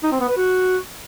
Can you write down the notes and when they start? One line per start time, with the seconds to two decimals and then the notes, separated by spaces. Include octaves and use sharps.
0.04 D#4
0.12 C4
0.20 B3
0.29 B4
0.37 F#4